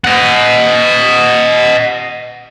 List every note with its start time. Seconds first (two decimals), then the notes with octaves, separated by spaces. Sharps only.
0.05 D#5 F#5